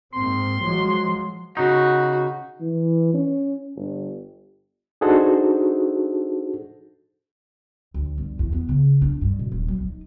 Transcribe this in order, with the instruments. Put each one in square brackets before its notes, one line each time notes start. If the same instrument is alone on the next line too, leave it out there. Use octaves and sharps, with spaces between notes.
[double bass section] G#2 A#3 C4 [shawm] C6
[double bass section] F3 F#3 G#3
[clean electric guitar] C#3 D#4 [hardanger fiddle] F#4
[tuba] E3
C#4
G1
[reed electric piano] D4 D#4 F#4 G#4 A4 C5
[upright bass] D2
G1
E2
B3
C#3
D4
G2
B2
D#1
F#3
D#4